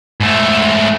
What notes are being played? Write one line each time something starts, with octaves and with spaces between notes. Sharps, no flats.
G#2 A3